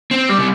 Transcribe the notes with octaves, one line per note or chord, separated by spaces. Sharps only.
C4
G3
C3